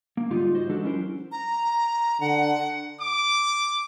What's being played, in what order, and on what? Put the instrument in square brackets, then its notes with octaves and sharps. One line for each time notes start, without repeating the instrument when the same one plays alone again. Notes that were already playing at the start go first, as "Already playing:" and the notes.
[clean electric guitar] A#3
D2 G#2 G3 D#4 F4
F#4 C5 D#5
E3 G#3 D4 F#4 G4 A4
F#3 C#4 E4 A#4 C5
[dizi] A#5
[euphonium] D3 [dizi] F#5
[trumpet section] D6